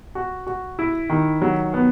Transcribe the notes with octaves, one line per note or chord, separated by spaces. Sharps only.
F#4
F#4
E4
D#3
F#3
B3